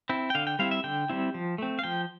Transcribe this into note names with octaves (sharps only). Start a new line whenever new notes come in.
C4 E4
G5
D3 F5
G5
G3 C4 E4 F5
E5
D3 G5
G3 C4 E4
F3
A3 C4
F5
F3 G5